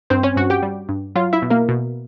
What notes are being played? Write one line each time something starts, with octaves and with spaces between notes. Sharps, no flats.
G2 C4 C5
C#4 C#5
G2 F#4 F#5
G4 G5
G3
G2
F#3 F4 F5
E4 E5
B2
A#3 A#4
B2